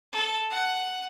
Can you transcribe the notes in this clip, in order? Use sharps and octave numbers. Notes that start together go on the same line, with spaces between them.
A4
F#5